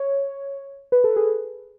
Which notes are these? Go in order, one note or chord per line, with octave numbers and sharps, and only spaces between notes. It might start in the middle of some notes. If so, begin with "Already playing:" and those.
Already playing: C#5
B4
A4
G#4